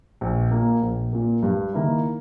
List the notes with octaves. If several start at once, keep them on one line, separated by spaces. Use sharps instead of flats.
A#1
A#2 A#3
A#1
A#2 A#3
G2
D#3 A#3 E4